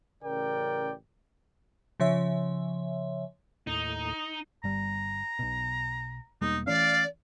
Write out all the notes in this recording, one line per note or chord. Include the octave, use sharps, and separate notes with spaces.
A1 C#3 A#4 D5 G5
C#3 F3 C#5 E5
D#2 A2 D#4
G1 G3 A#5
B1 B2
E1 G3 A#3 D#4
E3 A3 C#4 D5 F5